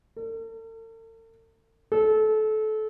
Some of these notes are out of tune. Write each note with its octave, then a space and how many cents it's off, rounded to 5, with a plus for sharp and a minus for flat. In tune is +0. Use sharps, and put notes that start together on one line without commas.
A4 +45
A4 -25